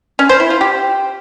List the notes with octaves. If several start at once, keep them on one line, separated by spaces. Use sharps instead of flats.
C#4
C5
E4
F4
G4